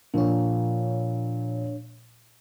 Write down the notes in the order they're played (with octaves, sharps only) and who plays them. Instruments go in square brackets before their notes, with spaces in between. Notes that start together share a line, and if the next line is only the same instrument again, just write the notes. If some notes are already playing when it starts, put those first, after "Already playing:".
[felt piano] A#2 F3 [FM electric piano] D4 C#5